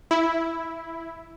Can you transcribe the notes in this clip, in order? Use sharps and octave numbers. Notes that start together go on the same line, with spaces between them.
E4